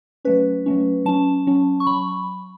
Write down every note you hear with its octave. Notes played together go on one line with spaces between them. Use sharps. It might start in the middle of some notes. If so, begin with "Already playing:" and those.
F#3 A3 C#4 B4
F#3 A3 C#4
F#3 C#4 A5
F#3 C#4
C#6
F#3 B5